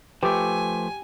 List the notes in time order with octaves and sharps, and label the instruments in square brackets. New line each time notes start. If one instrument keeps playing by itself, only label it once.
[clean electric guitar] F3 A3 [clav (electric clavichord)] G4 [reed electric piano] B4 D6 [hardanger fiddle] G#5